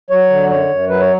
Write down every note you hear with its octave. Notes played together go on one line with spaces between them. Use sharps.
F#3 C#5
D3
F#2 C#5
F#2
F#3 B4
C#5